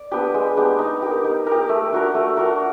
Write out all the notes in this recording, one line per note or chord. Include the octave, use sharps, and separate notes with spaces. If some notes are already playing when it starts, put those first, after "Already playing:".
Already playing: D5
B3 D4 G4
G#3
B3 D4 G4
D#4
G4 A#4
D#4
G4 A#4
A3
D4 F#4 A#4
A3
D4 F#4 A#4